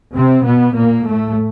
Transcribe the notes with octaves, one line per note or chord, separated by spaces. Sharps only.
C3 C4
B2 B3
A#2 A#3
A2 A3